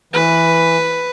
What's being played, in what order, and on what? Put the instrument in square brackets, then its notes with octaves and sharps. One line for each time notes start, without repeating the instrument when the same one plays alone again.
[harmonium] E3 [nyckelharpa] B4